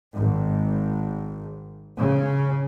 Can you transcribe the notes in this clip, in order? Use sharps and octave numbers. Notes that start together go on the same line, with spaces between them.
G#1
C#3